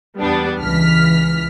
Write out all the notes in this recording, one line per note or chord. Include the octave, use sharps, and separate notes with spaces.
E2 G3 B3 D4
C#2 E3 F6 B6